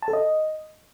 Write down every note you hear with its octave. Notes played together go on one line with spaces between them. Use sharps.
A5
A4
D#5